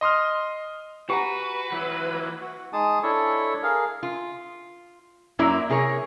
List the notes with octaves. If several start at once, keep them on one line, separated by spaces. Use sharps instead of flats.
D#5 C6 D#6 F6
F#4 G4 B4 G#5 A#5
E3 F#3
F#4
G#3 D#4 G#4 A5 D#6
D4 E4 A4 C#5
G#4 A#4 F5
F4
F#2 F#3 A#3 E4 D5 A#5
C3 G#4 A#4 C#5